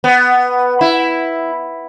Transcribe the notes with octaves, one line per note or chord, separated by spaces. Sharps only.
B3
E4